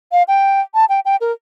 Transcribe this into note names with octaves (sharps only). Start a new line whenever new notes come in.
F5
G5
A5
G5
G5
A#4